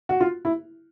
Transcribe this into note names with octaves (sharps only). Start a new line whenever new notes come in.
F#4
F4
E4